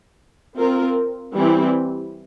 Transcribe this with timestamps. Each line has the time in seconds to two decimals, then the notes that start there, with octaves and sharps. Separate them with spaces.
0.56 C4 F4 A#4
1.33 E3 G3 C4 E4